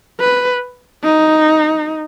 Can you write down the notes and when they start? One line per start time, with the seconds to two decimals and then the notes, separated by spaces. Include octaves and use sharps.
0.20 B4
1.03 D#4